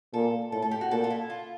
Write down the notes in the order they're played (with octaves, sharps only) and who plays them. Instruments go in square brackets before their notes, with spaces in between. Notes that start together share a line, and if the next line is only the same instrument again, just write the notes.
[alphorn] A#2 [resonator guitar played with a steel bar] A4
[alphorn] A2 [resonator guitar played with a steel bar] A4
[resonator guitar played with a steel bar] A4
G4
F#4
[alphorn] A#2 [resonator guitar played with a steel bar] A4
[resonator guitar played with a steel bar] F4
E4
F4